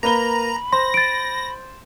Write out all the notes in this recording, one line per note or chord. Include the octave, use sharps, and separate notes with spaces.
A#3 B4 A#5 B5 G7
C5 C6 A#6
A6 D7